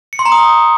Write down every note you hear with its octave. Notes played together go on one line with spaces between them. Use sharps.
C#7
C6
A#5
D#6